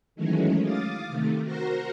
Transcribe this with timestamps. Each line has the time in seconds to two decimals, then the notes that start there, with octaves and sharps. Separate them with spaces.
0.15 D#3 E3 F#3 G#3 A3 C#4
0.63 F5 D6 D#6 A6
1.08 C3 D#3 A3
1.43 F#4 A#4 C5 F#5 A#6